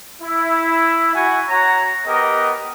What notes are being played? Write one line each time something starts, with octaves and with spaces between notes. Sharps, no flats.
E4
E4 F#4 F#5 G#5
F#4 C#5 A#5
B3 G4 A#4 D#5